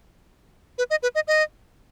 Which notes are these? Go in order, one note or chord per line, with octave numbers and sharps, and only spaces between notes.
B4
D#5
B4
D#5
D#5